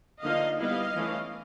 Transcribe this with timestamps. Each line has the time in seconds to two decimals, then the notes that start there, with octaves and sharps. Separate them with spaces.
0.22 D3 F3 A#3 D#4 D#5 F5
0.59 G3 B3 E4 D#5 F5
0.96 E3 A3 C#4